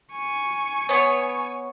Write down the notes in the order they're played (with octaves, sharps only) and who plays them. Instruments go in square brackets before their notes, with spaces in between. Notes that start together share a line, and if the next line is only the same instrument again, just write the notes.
[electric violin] G#5 C#6
[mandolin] B3 C#5